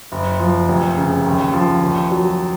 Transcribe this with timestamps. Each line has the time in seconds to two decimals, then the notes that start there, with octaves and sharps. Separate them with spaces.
0.12 F#1
0.40 F3
0.68 F1
0.97 C#3
1.26 D#2
1.54 F3
1.82 D#2
2.11 F#3